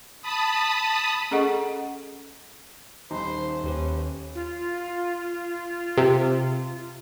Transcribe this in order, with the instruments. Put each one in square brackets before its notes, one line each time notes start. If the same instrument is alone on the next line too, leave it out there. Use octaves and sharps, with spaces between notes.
[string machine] A5 B5 D#6
[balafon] C#4 G#4 A4 D#5 F#5 C#6
[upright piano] D#1 B5 [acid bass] D#4 [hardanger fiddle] C5
[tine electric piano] D#2 G4 B4 [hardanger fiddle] C#4
[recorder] F4
[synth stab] C3